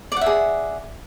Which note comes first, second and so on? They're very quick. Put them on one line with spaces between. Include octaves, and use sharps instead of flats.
D5 F#5 E5 G#4